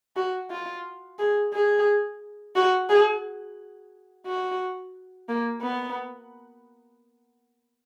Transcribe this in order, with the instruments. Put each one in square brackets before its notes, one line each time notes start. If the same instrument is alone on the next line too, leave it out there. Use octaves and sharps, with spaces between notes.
[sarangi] F#4
F4
G#4
G#4
F#4
G#4
F#4
A#3
B3